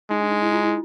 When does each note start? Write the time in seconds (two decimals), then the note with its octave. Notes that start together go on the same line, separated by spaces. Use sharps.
0.11 G#3 D#4
0.21 D4
0.31 D#4
0.42 E4
0.53 F4
0.63 E4